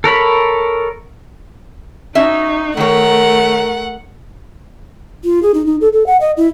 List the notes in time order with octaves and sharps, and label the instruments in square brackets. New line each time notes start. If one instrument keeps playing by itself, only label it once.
[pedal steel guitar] A4 A#4 C#5 B5
[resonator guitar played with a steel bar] C#4 F#4 E5 [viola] D#4
[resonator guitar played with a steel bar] D#3 C#5 [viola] A3 [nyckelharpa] A#4 [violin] F#5
[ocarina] F4
G#4
D#4
D#4
A4
A4
F#5
D#5
E4